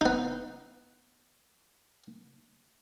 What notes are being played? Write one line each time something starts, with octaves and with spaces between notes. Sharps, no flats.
B3 D#4